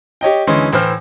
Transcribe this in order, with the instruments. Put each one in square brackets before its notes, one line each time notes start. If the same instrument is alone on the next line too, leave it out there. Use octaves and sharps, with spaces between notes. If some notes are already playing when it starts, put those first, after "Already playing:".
[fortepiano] G4 C#5 D#5 G5
D2 E3 G#3 C#4 C6
A2 E3 C5 F6